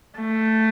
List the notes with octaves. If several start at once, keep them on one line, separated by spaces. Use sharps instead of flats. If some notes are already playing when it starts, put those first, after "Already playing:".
A3